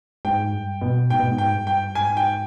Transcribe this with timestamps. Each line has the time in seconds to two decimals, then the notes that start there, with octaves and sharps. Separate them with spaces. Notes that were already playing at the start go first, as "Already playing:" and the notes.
0.25 G#2 G5
0.53 G2
0.81 B2
1.10 G#2 G5
1.19 B2
1.28 G#2
1.38 G5
1.53 G2
1.67 G5
1.95 G#2 G#5
2.17 G5